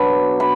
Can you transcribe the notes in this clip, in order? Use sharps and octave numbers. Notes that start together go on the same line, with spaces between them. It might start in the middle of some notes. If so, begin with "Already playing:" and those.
Already playing: B2 F#3 B3 D4 B5
B5